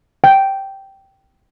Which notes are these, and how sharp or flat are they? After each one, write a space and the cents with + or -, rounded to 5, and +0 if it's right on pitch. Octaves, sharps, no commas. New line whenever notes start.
G5 -10